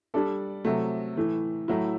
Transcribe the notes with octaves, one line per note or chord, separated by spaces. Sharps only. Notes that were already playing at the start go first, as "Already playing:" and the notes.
G3 D4 A4 D5
C3 F#3 A3
A2 E3 A3
A2 F#3 A3 E4